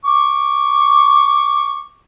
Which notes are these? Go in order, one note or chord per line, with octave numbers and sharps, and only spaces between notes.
C#6 D6